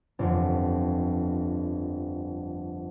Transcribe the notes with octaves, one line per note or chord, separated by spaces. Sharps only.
G1 F2